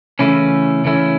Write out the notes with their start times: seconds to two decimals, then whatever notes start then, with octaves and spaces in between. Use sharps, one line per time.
0.19 C#3 E3 A3 C#4 E4
0.84 C#3 E3 A3 C#4 E4